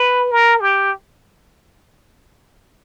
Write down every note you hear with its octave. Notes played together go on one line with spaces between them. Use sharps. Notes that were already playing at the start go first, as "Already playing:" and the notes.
Already playing: B4
A#4
G4